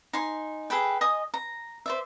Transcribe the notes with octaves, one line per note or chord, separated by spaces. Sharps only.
D#4 G#5 C6
G#4 A4 B4 G5
D#5 G#5 D#6
A#5
C5 D5 E5